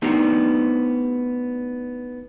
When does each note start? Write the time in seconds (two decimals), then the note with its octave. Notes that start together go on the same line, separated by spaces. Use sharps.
0.02 A3 B3 C4 D4 D#4 G4